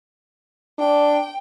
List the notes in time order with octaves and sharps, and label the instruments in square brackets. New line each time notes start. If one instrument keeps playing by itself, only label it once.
[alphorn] D4 [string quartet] G5